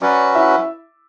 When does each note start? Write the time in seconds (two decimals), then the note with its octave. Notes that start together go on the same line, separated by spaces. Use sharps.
0.02 F#3 C#4 F#4 B4 D5
0.35 E4 E5